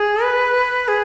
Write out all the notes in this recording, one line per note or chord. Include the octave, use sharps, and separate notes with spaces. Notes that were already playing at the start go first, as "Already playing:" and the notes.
Already playing: G#4
B4
G#4